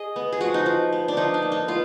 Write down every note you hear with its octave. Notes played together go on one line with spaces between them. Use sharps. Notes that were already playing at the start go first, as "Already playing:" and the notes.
Already playing: G#4 D#5
B3
G#4
F3 F#4
D#4
F3
B3
D4
F3 D#4
D4
A#3
D#4
B3 F4